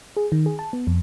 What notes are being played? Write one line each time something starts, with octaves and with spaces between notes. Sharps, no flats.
G#4
D#3
G#4
A5
B3
F2